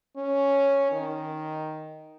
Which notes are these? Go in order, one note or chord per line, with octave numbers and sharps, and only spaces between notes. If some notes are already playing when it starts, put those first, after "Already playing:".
C#4
D#3